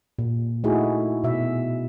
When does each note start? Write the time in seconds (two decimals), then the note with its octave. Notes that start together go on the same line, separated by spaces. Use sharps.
0.18 A#2
0.64 A3 D#4 E4 F#4 G#4
1.24 B2 E5